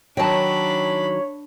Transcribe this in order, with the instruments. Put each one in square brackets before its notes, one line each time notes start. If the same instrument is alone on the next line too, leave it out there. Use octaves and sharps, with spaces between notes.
[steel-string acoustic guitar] D#3 F#3 [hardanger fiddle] D4 B5 [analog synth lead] C#5 [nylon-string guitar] G5 A5